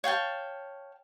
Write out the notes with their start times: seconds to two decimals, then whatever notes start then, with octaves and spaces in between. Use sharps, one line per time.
0.04 C#5 F5 G5 A5